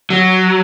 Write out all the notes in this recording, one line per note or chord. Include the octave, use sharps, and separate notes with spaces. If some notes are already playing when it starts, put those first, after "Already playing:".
F#3